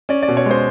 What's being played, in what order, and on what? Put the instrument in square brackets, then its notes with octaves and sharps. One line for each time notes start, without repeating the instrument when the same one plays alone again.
[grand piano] C#4 D5
D5
B2
C#5
G#3 C5